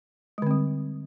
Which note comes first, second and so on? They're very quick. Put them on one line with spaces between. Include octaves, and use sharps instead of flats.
G#3 D3 C4 G3